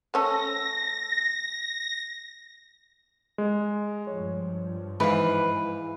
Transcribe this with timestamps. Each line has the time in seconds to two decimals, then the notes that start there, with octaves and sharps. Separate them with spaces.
0.14 A3 C#4 A4 A#6
3.38 G#3
4.07 G2 F3 C#5
5.00 G#2 E3 B4 F5